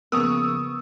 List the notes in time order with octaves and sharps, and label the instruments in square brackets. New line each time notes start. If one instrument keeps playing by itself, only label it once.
[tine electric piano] C#3 F3 A#3 [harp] B3 [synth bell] A#4 [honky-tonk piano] C#6 D#6 E6